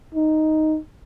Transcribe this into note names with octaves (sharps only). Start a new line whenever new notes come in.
D#4